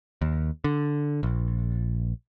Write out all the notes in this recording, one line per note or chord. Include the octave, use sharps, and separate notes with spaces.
D#2
D3
A#1